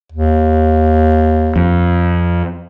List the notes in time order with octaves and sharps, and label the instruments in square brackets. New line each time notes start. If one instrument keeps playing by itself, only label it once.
[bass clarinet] D#2
[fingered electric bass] F2